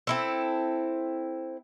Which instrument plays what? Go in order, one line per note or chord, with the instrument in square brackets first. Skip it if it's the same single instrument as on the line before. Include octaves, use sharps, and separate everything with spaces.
[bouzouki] C4 E4 A4